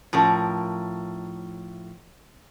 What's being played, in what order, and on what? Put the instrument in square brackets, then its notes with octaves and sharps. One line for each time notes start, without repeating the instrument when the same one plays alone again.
[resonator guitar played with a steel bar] A2 F3 C#4 A#4